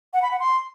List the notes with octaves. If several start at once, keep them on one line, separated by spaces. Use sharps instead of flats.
F#5
B5
F#5
C6